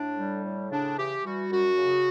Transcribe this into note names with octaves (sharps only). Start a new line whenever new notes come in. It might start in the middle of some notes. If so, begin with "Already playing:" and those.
Already playing: A2 D4
G3
A2
C#3 D4
E3 G4
G3 F#4
F#2 F#4
C#3